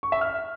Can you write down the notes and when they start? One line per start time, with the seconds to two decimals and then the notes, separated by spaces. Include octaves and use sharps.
0.03 C#6
0.12 E5
0.21 F6